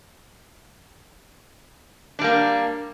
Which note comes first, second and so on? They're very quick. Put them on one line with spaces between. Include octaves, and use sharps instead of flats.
D4 G3 A#3